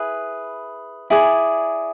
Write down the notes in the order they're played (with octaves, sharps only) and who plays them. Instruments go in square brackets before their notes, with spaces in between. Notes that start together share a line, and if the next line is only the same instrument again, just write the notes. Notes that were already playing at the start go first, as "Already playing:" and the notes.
Already playing: [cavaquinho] E4 G#4 B4
E4 G#4 D5 G#5